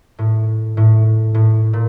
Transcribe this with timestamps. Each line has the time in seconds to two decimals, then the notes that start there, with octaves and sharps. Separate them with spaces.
0.18 A2
0.77 A2
1.34 A2
1.73 A#2